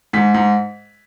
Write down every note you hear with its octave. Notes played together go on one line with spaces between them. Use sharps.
G#2 B6
G#2